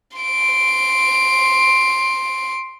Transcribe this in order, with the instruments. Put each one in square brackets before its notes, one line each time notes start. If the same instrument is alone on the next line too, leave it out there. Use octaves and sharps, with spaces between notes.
[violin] C6 D7